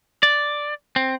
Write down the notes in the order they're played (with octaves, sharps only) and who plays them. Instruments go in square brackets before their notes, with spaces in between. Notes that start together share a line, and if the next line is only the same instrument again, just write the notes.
[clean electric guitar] D5
C4